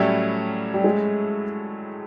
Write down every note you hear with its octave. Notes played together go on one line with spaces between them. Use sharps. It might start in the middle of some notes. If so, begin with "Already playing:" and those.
Already playing: A2 F#3 G3 A3 C#4 E4
G3
G#3